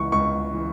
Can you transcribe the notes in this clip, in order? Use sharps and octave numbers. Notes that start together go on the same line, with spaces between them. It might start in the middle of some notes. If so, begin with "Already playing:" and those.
Already playing: C#2 E3 C#6
C#2 C#6
E3